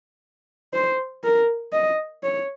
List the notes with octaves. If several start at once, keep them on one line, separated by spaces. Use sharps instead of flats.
C5
A#4
D#5
C#5